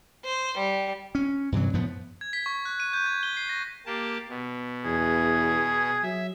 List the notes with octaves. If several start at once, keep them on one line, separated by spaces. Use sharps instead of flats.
C5
G3
C#4
G2 C3 E3 F#3
F#2 A2 F3 B3
G#6
B6
C#6
F#6
D#7
G6
G#6
G7
C7
A#6
A#3 G4 A5
B2
E2 G#4
F#3 E5